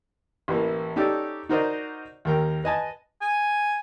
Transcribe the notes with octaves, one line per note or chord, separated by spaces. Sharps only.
A1 E3 A#3
C#4 D#4 G4 A4 D5
D#4 F#4 A#4 C5 D5 D#5
D#2 A#4 G5
B4 D#5 G#5 A5
G#5